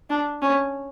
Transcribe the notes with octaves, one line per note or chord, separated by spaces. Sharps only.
D4
C#4